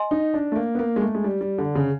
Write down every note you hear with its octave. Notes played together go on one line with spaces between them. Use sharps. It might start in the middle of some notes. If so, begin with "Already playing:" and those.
Already playing: D#5 G#5 C6
D#4
D4
A3
A#3
B3
A#3
G#3
A3
G#3
G3
G3
D3
C#3